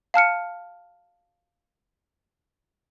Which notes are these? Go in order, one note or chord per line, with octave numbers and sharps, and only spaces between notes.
F5 A5 F6 C#7